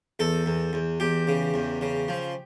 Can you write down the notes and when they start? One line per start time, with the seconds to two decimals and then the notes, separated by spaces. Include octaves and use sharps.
0.19 E2 A4
0.46 E2
0.73 E2
1.00 E2 G4
1.27 C#3
1.54 E2
1.81 C#3
2.08 F3